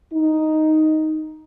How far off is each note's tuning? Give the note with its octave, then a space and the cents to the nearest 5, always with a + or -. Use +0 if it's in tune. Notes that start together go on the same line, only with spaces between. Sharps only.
D#4 +0